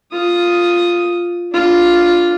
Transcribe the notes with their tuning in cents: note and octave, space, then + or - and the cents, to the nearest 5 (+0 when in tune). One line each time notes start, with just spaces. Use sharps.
F4 +0 D#6 +0
D4 -5 F4 +0